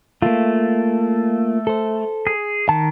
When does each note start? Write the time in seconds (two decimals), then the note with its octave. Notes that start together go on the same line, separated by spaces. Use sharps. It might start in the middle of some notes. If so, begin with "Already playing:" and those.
0.22 A3 A#3 F4
1.67 A4 C5
2.27 G#4
2.69 D#3 A5